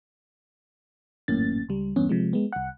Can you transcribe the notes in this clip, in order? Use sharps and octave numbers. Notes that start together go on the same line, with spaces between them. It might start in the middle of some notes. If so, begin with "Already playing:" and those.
G#1 F#2 A2 A#3 C#4 A6
C#2 G3
E2 G2 B3 C#4
C3 F3 G#3
G#3 B3
C2 F#5